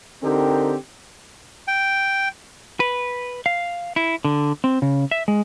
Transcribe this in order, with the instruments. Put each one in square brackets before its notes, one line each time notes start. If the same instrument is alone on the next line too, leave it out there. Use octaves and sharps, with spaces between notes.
[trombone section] D3 C4 D#4 G4 A#4
[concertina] G5
[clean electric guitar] B4
F5
E4
D3
C4
C#3
E5
G#3